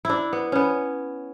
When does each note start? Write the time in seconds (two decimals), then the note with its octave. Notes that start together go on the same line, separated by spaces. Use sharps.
0.05 D4 E4
0.33 B3
0.52 B3 C#4